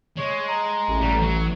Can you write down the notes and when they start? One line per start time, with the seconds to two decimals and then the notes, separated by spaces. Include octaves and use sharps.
0.17 G#3 C#5
0.48 A#5
0.88 A1
1.01 F#3 G3
1.22 F#3